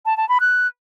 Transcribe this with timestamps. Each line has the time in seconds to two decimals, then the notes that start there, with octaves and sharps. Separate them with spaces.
0.06 A5
0.17 A5
0.29 B5
0.40 F#6